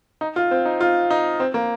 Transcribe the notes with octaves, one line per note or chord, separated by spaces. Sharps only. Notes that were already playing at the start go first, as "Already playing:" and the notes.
D#4
F4
C4
D#4
F4
D#4
C4
A#3